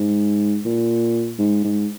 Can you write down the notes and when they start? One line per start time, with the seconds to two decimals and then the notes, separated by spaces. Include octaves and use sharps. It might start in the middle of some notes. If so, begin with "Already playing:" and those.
Already playing: G#2
0.65 A#2
1.39 G#2
1.64 G#2